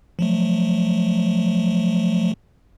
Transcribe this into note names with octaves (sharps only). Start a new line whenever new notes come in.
F3 F#3 A3